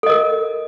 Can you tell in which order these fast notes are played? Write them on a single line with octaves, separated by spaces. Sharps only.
A4 D#5 A#4